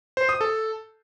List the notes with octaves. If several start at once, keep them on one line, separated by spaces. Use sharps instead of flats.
C5
D#6
A4